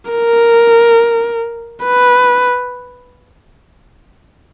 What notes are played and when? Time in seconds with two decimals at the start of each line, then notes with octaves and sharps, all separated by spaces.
0.11 A#4
1.84 B4